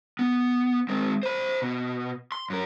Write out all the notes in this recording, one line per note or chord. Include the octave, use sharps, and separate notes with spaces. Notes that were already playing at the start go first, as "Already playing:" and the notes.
B3
G#3 C4
C5 B5
B2
C6
F#2 A#4